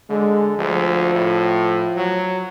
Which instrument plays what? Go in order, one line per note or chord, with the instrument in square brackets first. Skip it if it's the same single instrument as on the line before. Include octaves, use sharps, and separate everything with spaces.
[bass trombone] D3 [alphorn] G#3
[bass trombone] D2 [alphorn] F3
[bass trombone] A2
F#3